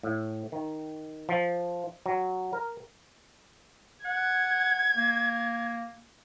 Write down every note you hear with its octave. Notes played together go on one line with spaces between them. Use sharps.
A2
D#3
F3
F#3
A#4
F#5 G#6
A#3